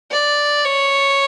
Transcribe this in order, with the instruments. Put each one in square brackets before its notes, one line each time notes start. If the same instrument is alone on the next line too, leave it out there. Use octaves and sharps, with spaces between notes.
[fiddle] D5
C#5